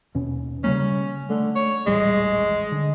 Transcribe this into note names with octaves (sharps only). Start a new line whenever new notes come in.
D#2 B2 C#4
C#3 G3 A#3 C#4
D3 A3
C#5
D#1 A1 G3 G#3
D3